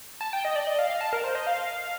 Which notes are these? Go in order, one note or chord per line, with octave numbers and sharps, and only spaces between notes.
A5
G5
D#5
D5
D#5
F5
F5
A5
A#4
C5
D#5
F5